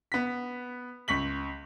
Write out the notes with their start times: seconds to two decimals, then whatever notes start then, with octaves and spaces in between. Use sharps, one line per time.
0.12 B3 B6
1.08 C#2 C#6 B6 F#7